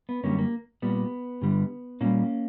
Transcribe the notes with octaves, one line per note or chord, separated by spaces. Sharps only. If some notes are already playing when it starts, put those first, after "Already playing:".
B3
F#2 D3 G3 A#3 C#4
A#3
A#2 G3 B3
G2 D3 G3
A#2 G3 A#3 C#4